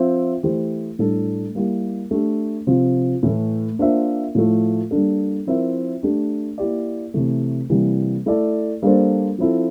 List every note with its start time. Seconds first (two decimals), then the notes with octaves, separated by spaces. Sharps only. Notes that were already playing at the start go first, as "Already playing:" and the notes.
Already playing: F3 C4 F4 C5 E5
0.43 E3 A3 E4 G4 C5
0.99 A2 G3 D4 A4
1.55 G3 A#3 E4 G4
2.11 A3 D4 G4
2.67 C3 F3 C4 F4
3.23 A2 E3 A3
3.79 A#3 D4 F4 C5 E5
4.35 A2 F3 A3
4.91 G3 A#3 D4 A4
5.47 F3 C4 E4 A#4 E5
6.03 A3 D4 G4
6.58 A#3 E4 G4 D5
7.14 C3 E3 A3
7.70 C3 E3 G3 A#3
8.26 A3 E4 A4 D5
8.82 G3 A#3 D4 A4 C5
9.38 F3 C4 E4 A4